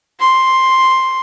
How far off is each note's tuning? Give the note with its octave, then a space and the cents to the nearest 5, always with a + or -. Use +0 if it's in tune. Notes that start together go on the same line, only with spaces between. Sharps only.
C6 +5